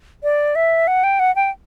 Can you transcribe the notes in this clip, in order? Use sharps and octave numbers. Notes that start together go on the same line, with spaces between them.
D5
E5
F#5
G5
F#5
G5